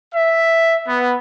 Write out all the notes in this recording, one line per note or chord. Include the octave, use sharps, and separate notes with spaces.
E5
B3